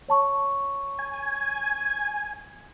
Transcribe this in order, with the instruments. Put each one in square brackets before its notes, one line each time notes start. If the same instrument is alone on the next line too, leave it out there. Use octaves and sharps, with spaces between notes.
[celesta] C#5 A5 C#6
[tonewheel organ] G#5